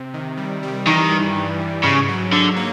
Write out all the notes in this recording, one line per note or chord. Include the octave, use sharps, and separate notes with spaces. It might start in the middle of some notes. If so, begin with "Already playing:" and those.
Already playing: C3
D#3
G3
G3
D#3 E3
G2
G2
G2
G#2 C#3
F#3
G#2 D3
A#3